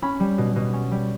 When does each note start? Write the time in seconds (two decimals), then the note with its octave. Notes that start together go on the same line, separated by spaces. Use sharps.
0.02 C#4 B5
0.20 G3
0.38 B2
0.56 B2
0.73 C#4
0.91 G3